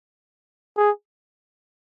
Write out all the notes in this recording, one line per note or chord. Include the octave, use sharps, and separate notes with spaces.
G#4